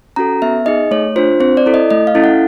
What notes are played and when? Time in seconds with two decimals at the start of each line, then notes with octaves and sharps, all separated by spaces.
0.16 C#4 F#4 A4 A#5
0.42 B3 E5
0.66 D#4 G#4 D#5
0.91 A3 C#5
1.16 D4 F4 C5
1.40 C4 C5
1.57 D5
1.66 E4 A4
1.74 D#5
1.90 A3 D#5
2.07 F5
2.15 C#4 E4 A4
2.24 F#5